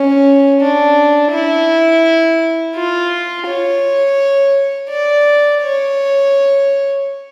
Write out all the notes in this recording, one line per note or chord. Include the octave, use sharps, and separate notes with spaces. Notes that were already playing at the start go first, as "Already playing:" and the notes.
Already playing: C#4
D4
E4
F4
C#5
D5
C#5